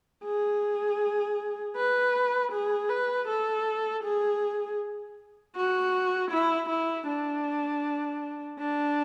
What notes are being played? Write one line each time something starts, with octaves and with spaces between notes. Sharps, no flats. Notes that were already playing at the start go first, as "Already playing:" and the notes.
G#4
B4
G#4
B4
A4
G#4
F#4
E4
E4
D4
D4